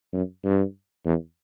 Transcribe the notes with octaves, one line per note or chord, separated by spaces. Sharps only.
F#2
G2
E2